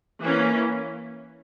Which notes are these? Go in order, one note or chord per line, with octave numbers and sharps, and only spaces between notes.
E3 A#3 C#4